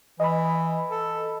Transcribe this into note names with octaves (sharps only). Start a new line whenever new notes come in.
E3 D#5 B5
A4